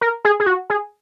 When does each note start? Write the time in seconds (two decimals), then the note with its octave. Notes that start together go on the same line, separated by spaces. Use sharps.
0.01 A#4
0.25 G#4
0.40 G#4
0.46 F#4
0.70 G#4